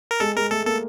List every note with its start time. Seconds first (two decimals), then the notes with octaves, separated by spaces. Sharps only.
0.11 A#4
0.20 G#3 A4
0.36 G#3 A#4
0.51 A3 A4
0.66 A#3 A4